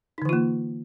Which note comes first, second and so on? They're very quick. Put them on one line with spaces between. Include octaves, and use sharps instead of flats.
D#4 D3 E3 F4 A#3